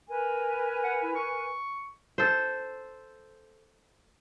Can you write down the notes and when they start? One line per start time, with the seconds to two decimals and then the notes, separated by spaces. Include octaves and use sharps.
0.09 A#4 B4 G#5
0.84 F#5
1.03 E4
1.15 C#6
2.18 A4 C5